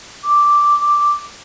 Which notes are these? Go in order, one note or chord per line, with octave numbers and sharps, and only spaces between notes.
D6